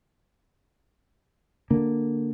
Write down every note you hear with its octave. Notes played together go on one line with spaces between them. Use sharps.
D3 A#3